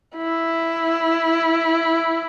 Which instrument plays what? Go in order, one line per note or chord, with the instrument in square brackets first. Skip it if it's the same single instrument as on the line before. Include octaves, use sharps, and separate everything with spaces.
[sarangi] E4